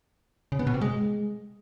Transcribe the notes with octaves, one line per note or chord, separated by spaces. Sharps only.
C#3
B3
B2
C3
G#3